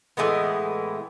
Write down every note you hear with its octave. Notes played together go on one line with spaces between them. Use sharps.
A2 E3 G#3 B3